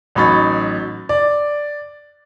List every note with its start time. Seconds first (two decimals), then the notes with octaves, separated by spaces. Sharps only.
0.15 A1 F#3 D#4 B5 C#6 A6
1.09 D5